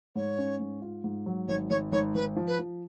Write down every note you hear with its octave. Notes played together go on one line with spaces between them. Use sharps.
G#2 C#5
C#4
G#2
F4
G#2
F#3
G#1 C#5
G#1 C#5
G#1 C#5
G#1 B4
F3
B4
F3